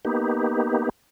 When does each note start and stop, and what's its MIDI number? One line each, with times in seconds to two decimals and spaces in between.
0.05 0.89 58
0.05 0.89 59
0.05 0.89 63
0.05 0.89 67